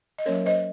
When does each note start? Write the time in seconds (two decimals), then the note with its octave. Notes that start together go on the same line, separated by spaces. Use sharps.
0.18 D#5
0.26 F#3 A#3 C#4 A#4 C#5
0.46 C5 D#5